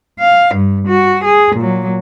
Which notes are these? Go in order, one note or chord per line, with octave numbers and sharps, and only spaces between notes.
F5
G2
F#4
G#4
A#2 F#3